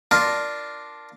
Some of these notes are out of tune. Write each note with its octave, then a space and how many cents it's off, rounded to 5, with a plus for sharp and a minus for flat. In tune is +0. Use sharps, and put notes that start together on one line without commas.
D4 +0 F4 +0 A#4 +0